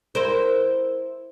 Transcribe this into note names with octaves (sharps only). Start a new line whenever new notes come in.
E4 A#4 C5